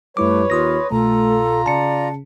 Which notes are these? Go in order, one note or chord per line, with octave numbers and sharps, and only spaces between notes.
F#2 G3 A3 E4 B4 C#5 D6
D#2 F4 C6 D#6 A#6
C2 B2 A3 F4 A4 A#5
C#3 D5 A5 C#7